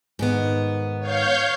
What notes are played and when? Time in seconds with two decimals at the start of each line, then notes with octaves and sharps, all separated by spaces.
0.19 G#2 D#3 B3
1.00 C#5 F5 G6